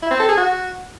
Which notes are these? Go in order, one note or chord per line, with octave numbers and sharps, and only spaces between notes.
E4
C4
A4
G#4
F#4